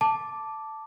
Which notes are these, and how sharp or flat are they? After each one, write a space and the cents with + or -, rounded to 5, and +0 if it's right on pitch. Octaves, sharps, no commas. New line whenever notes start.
A5 +0 D6 +0